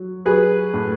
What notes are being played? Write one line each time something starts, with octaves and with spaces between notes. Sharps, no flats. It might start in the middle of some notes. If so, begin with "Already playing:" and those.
Already playing: F#3
F#3 G#4 B4
A2